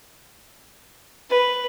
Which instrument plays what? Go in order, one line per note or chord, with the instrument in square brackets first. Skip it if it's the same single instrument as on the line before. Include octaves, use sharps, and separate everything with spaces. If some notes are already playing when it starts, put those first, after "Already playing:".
[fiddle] B4